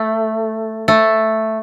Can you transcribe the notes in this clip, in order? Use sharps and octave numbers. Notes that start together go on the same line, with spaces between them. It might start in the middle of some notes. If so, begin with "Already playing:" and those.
Already playing: A3
A3